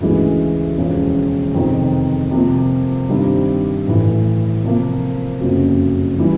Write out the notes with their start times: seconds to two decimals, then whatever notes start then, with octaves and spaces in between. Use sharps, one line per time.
0.01 D2 C#3 E3 G#3
0.78 E1 E2 C#3 F3
1.54 F2 C3 D#3
2.31 C3 F3 A#3
3.09 G2 D#3 G3 C4
3.86 A1 A2 E3
4.63 C3 F3 A#3
5.40 F#1 F2 C#3 F#3
6.19 E3 G3